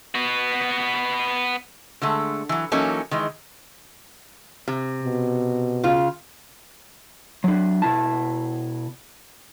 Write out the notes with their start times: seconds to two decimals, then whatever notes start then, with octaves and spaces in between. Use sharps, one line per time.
0.15 B3 F#4
2.02 D3 G#3 A3
2.49 E3 F#3
2.72 E3 F#3 A#3 C#4 D#4 A4
3.11 D#3 E3 G#3
4.68 C3
5.03 B2
5.83 C#3 F4
7.44 F#3 D4
7.82 B2 E4 A5